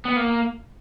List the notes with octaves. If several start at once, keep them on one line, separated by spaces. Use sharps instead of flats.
B3
A#3